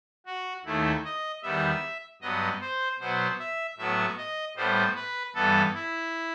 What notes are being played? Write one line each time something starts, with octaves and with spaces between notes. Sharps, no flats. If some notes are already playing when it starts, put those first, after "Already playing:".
F#4
D#2 D#3 A3 E4
D#5
E2 D#3 G3 B3 E5
G2 F#3 B3 D#5
C5
B2 F#3 B3 C5
E5
A2 F#3 B3 E5
D#5
A2 G3 B3 C5
B4
G2 E3 B3 A4
E4